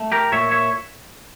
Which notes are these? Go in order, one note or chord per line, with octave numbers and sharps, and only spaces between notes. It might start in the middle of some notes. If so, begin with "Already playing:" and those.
Already playing: A3
G4 A#4
A#2 C#5 E5
C#5 E5